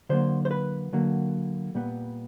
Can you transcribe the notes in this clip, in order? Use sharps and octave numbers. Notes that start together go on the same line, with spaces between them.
D3 F#3 A#3 C5
C5
B4
D3 F#3 A#3
A#2 G3 B3